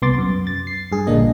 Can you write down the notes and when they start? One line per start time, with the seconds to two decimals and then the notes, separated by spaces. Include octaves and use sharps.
0.02 C2 B3 C6 D6 A6
0.18 F#2
0.47 A6
0.67 C7
0.92 G2 G#4
1.07 A#1 A#2 D3 A#3 D4 D#5